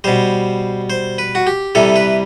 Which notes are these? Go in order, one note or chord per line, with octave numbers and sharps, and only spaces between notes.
B2 G3 C5
C5
B4
F#4
G4
C3 E3 G3 A4
B4